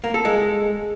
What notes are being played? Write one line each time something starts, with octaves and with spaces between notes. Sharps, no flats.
A#3
A4
G#3